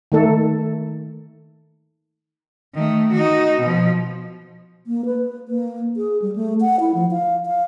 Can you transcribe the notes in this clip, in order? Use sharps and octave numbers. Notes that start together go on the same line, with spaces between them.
D#3 A3 A4
D#3 A3
D#4 F#4
B2 F3
A#3
B4
A#3
G#4
G3
A3
F#5
E4
F3
F5
F5